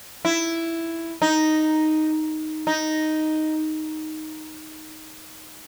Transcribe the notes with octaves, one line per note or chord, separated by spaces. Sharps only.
E4
D#4
D#4